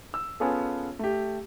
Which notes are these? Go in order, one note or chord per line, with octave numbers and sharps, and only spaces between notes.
E6
B3 C#4 F4 G#4 A4
A3 G4